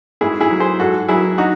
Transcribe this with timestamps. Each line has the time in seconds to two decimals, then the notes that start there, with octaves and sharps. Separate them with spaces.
0.21 G#2 E4 G#4
0.40 E4 G#4
0.50 F#3
0.60 G#4 C5
0.80 G#2 F#4 A4
1.08 F#3 E4 G#4
1.38 D#4 F#4